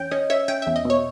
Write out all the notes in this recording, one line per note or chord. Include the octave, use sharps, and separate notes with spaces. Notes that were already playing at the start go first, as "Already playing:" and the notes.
Already playing: E2 C#4 G5
C#4 D#5
C#4 E5
C#4 G5
E2 E5
D#5
B2 C#5